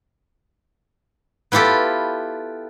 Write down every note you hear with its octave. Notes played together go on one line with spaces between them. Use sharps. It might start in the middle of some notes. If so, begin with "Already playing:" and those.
B3 E4 F4 G4 A4